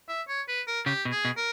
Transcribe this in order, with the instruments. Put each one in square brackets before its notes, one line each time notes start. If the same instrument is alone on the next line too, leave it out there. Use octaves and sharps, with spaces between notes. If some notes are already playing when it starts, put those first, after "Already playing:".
[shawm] E5
C#5
B4
A#4
[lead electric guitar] C#3 [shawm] G4
[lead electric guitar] B2
[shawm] G#4
[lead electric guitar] B2
[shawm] A#4